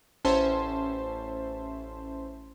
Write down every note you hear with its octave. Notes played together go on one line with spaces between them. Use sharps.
A1 C#4 C5 E5 A5 C6